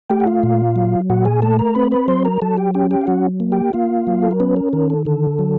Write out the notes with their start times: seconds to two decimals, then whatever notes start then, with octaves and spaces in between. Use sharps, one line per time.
0.10 A3 G4 G5
0.20 F#5
0.26 F4 F5
0.43 A#2
0.76 F#3
1.10 A#2 F#4 F#5
1.25 G#4 G#5
1.42 A3 A4 A5
1.59 A#4 A#5
1.75 C4 B4 B5
1.91 B4 B5
2.08 F#3 C5 C6
2.25 A#4 A#5
2.42 F#3 A4 A5
2.57 G4 G5
2.74 C#4 G4 G5
2.91 G4 G5
3.01 F5
3.07 F#3 F#4 F#5
3.40 A#3
3.52 G4 G5
3.73 A#3 F4 F5
4.07 F#3
4.22 A4
4.31 A#4
4.40 B3 C#4 B4
4.56 A#4
4.73 D#3 A#4
4.90 A4
5.05 D3 A4
5.39 F#3